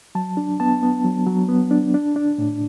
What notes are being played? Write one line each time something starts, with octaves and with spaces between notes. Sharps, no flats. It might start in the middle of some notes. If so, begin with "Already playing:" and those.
F#3 A5
D4
B3 A5
B3
F#3
F#3
B3
D4
D4
D4
A2